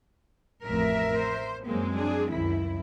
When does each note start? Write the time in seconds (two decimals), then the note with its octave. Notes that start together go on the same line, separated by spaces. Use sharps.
0.65 A1 F2 A2 A#4 E5
1.14 C5
1.66 F#2 F#3 G#3 A#3 C4
1.98 D4 G#4
2.32 C#2 F#2 D#3 E4